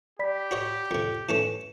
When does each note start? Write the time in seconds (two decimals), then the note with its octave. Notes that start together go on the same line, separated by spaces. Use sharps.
0.19 G4 D5 B5 B6
0.51 F#4 C#5 D#5
0.91 F2 C3
1.29 E3 A3 C#4 E7